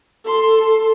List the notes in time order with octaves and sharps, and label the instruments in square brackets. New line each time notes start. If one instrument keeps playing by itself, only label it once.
[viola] A4 C6